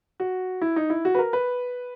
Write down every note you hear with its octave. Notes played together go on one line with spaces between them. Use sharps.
F#4
E4
D#4
E4
F#4
B4
A#4
B4